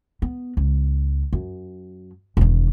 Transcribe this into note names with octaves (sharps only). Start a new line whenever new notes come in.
B3
C#2
F#2
E1 D#3